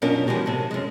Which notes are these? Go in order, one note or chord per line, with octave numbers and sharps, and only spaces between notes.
F#2 B2 C#4 D4 F4 A#4
E3 F3 G#3 F#4 G4
A2 C3
F#2 G#3